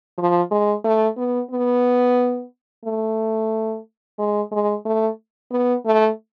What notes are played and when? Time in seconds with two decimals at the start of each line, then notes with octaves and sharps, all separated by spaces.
0.18 F3
0.51 G#3
0.84 A3
1.17 B3
1.51 B3
2.85 A3
4.19 G#3
4.52 G#3
4.86 A3
5.51 B3
5.85 A3